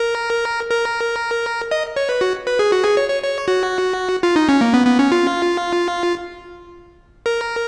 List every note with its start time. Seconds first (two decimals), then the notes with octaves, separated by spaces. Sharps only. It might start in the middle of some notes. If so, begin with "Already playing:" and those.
Already playing: A#4
0.70 A#4
1.71 D#5
1.96 C#5
2.09 B4
2.21 F#4
2.47 B4
2.59 G#4
2.72 F#4
2.84 G#4
2.97 C#5
3.09 C#5
3.23 C#5
3.48 F#4
4.23 F4
4.36 D#4
4.49 C#4
4.61 A#3
4.74 B3
4.86 B3
4.99 C#4
5.12 F4
7.26 A#4